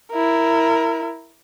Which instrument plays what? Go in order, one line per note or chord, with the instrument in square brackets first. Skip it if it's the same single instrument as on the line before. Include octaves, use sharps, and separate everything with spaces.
[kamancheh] E4 A#4